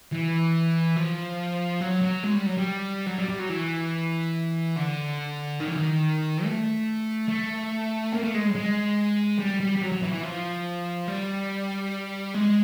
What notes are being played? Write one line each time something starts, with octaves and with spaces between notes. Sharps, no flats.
E3
F3
F#3
F#3
G#3
G3
F#3
G3
F#3
G3
G3
F#3
E3
D3
D#3
E3
D#3
A3
A3
A#3
A3
G#3
G#3
G3
G3
G3
F#3
F#3
E3
E3
F3
G3
G#3